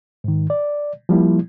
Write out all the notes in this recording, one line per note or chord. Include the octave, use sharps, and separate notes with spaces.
G#2 D#3
D5
F3 G3 A#3 E4